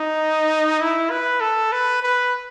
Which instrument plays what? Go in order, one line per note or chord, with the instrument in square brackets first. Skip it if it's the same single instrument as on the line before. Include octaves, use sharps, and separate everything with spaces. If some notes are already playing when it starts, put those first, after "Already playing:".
Already playing: [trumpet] D#4
E4
B4
A4
B4
B4